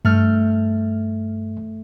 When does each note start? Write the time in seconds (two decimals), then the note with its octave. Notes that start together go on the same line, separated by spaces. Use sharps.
0.05 G2 A3 F6 G6